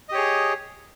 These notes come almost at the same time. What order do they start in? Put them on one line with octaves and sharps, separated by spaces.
D#5 G4 C#5 G#4